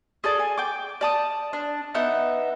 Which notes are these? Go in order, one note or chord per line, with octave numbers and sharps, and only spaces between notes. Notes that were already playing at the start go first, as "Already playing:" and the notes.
G#4 A4 D5
G#5
G5 D6
D5 A5 D#6
D4
B3 D#4 E5 F#5